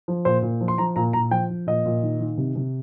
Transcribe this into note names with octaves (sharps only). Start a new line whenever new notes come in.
F3
A#2 C5
A#2
F3
C6
F3 A#5
A#2 A#5
A#2 A#5
F3 G5
F3
A#2 D#5
A#2
D#3
D#3
C3
C3